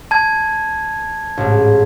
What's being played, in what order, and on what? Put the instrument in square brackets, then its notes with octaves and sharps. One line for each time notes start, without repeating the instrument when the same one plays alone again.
[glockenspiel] A5 G#6
[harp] A1 G#2